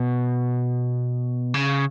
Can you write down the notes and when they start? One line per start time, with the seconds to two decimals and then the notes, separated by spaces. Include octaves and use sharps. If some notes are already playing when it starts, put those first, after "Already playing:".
Already playing: B2
1.54 C#3